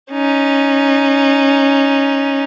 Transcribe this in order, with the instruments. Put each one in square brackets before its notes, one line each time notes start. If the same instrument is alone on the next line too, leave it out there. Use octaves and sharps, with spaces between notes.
[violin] C#4 D#4